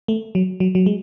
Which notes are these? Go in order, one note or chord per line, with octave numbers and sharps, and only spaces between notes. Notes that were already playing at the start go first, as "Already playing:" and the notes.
A3
F#3
F#3
F#3
G#3